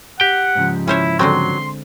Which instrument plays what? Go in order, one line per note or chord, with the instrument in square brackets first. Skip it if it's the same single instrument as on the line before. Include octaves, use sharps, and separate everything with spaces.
[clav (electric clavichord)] G4 G5 [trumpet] F#5
[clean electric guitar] G#2 C#3 F3
[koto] C#4 C5 C#5 [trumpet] E4
[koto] D3 G#3 C4 [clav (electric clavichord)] F#3 [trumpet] C6